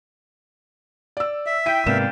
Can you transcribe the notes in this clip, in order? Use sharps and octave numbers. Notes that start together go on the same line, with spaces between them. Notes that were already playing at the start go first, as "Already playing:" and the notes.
D5 E6
E5
E4 G5 B6 D#7
G#2 C3 A#3 B3 D5 F5 G5 E7